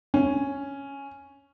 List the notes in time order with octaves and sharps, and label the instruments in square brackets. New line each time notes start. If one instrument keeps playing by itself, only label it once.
[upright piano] C#4